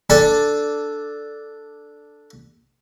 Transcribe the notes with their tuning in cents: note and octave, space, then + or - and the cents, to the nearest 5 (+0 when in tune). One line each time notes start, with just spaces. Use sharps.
D4 +0 A4 +0 G#5 +40